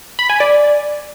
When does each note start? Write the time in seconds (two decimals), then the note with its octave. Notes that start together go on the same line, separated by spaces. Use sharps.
0.19 B5
0.30 G#5
0.40 D5